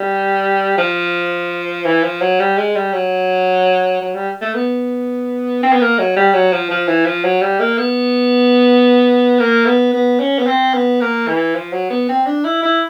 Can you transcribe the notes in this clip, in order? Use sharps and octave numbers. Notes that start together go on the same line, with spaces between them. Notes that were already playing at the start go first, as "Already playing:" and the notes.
Already playing: G3
F3
E3
F3
F#3
G3
G#3
G3
F#3
F#3
G3
A3
B3
C4
B3
A#3
F#3
G3
F#3
F3
F3
E3
F3
F#3
G3
A#3
B3
A#3
B3
B3
C#4
B3
C4
B3
A#3
E3
F3
F#3
B3
C4
D4
E4
E4